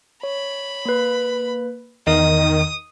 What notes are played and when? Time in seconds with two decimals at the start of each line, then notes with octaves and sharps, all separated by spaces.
0.23 C#5 B5
0.85 A#3 B4
2.07 E2 D#3 D#4 A#4 D#5 D#6